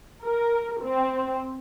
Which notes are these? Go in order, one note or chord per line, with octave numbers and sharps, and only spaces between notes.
A#4
C4